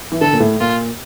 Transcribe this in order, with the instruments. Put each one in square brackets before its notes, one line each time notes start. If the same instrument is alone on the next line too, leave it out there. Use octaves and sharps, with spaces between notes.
[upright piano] E3
[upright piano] D3 [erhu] A4
[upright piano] A#2
A2
[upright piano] A#2 [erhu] F4